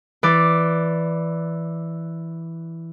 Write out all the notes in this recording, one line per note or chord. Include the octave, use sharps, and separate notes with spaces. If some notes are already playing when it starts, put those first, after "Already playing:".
E3 D5